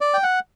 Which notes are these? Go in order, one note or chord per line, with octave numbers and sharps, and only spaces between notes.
D5
G5
F#5